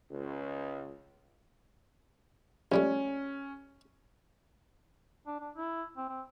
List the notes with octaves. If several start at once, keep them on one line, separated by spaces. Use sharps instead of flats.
C#2
A#1 G3 A3 C#4
D4
D4
E4
C4
C4